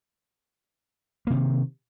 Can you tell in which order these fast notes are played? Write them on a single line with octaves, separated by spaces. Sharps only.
A#3 C3 D#3